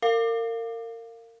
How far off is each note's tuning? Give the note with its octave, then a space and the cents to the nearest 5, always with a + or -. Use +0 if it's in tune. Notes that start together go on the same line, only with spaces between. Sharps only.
A#4 -30 F5 +0